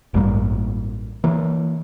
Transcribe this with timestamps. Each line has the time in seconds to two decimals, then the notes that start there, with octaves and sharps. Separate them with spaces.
0.14 A1 G2 G3 A#3
1.24 E3 A#3